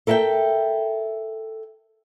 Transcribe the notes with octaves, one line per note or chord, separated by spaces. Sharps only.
A4 A#4 E5 F5 G5